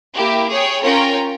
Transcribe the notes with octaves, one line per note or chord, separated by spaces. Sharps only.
A#3 E4 G4
G#4 C#5 G5
C#4 F4 A#4 C#5 G5